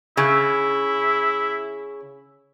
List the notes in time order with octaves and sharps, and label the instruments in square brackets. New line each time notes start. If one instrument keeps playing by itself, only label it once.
[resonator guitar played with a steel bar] C#3 [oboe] E4